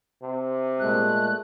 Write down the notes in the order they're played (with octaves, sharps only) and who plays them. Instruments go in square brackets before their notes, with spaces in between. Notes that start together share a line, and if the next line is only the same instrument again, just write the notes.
[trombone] C3
[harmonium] A#2 G#3 A3 [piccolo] F#6